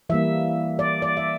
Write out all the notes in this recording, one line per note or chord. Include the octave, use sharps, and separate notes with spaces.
E3 G3 A#3 E5
D5
D5
E5